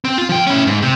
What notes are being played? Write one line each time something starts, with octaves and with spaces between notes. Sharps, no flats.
C4
F4
F3 G5
C#4 E4
G#2
C3